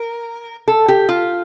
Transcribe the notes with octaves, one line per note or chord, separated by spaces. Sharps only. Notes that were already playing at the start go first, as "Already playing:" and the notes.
Already playing: A#4
A4
G4
F4